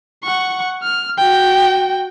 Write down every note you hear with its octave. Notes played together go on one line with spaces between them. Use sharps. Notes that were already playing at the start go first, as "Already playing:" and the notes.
F#5 C#6
F6
F#4 G5